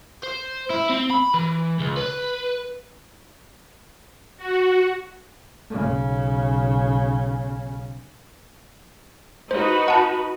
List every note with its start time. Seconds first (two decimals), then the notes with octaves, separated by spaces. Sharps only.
0.23 C5
0.70 E4
0.90 C4
1.11 B5
1.34 E3
1.79 C#2
1.97 B4
4.37 F#4
5.71 B1 C#3
9.51 D#4 F#4 B4 C5
9.88 F#5 A5